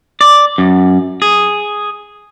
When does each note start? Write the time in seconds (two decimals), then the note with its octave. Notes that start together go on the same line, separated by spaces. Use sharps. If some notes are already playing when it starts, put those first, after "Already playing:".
0.21 D5
0.58 F#2
1.22 G#4